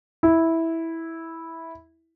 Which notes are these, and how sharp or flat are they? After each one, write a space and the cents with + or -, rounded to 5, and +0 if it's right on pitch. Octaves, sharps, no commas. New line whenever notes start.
E4 -10